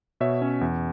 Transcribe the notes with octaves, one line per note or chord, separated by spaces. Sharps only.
B2 C#5 E5
C#4
E2